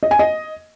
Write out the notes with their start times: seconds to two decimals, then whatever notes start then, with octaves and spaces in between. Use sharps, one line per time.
0.03 D#5
0.11 G#5
0.19 D#5